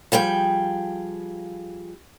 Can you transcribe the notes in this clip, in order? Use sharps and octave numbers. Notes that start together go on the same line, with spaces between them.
F3 G3 G#4 G5